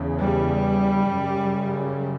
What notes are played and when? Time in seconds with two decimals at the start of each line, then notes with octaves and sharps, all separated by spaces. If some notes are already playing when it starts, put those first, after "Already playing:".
Already playing: E2 C#3
0.22 G3
1.11 F#2 C#3